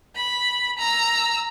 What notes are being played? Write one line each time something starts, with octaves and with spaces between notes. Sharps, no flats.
B5
A#5 E6